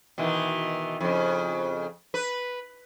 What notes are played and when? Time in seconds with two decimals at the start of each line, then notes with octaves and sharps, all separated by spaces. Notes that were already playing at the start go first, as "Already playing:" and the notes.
0.18 B2 D#3 E3
1.00 F2 C#3
2.14 B4